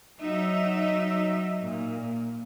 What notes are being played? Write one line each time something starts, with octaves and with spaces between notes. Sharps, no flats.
F#3 D#4 E5
A#2